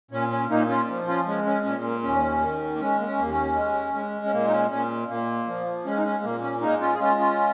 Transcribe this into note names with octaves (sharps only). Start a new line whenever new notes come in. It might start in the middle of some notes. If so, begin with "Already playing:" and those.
A#2 C#4
C#4
A#2 A#3 D#4
C#4 F4
F3
C#4 F4
G#3 C#4
C#4
A#2 C#4
A#3
D#2 C#4
D#3
A#3
G#3 C#4
A#3
C#4
D#2 A#3
C#4
G#3
G#3
C#4
A#2 A#3
D#4
C#4
A#2 C#4
A#2 A#3
F3
G#3 C#4
D#4
C#4
A#2 A#3
C#4
G#3 A#3 D#4
C#4 F4
G#4
G#3 C#4 F4
C#4 F4